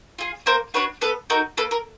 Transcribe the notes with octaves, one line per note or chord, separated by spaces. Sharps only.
F4 G#4
A#3 A#4 C5
D4 F#4 B4 C#5
B3 A4 B4
D#4 F#4 A4 A#4
A#3 A4 B4
A#4